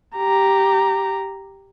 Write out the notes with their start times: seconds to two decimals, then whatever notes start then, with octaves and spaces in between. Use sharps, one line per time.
0.16 G4 A#5